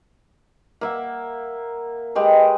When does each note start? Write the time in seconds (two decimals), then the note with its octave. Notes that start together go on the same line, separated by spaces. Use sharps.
0.81 A#3 E5 F#5
2.15 G#3 G4 B4 D#5